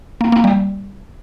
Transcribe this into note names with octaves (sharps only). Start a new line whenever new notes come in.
A#3
A#3
G3